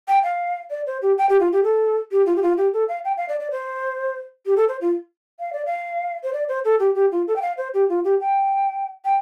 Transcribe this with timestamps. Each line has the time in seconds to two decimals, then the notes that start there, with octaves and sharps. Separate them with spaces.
0.08 G5
0.24 F5
0.70 D5
0.87 C5
1.02 G4
1.18 G5
1.29 G4
1.40 F4
1.52 G4
1.64 A4
2.12 G4
2.26 F4
2.36 G4
2.42 F4
2.57 G4
2.73 A4
2.89 F5
3.05 G5
3.17 F5
3.29 D5
3.40 D5
3.51 C5
4.46 G4
4.57 A4
4.69 C5
4.81 F4
5.40 F5
5.53 D5
5.66 F5
6.23 C5
6.33 D5
6.49 C5
6.65 A4
6.80 G4
6.95 G4
7.12 F4
7.27 A4
7.36 G5
7.42 F5
7.57 C5
7.74 G4
7.89 F4
8.04 G4
8.21 G5
9.05 G5